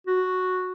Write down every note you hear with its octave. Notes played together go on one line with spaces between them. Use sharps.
F#4